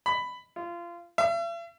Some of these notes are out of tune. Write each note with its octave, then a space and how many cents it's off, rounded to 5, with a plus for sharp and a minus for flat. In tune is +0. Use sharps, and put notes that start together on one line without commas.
B5 +10
F4 -25
E5 +45